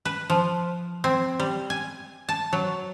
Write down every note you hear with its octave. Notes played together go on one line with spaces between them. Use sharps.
B4
F3
C4
G3
G#5
A5
F#3